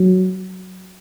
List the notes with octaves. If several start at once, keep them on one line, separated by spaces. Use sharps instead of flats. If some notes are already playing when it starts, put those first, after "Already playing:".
Already playing: F#3